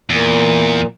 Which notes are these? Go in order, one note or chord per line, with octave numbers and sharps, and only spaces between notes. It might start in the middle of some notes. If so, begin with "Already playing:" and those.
E2 A#2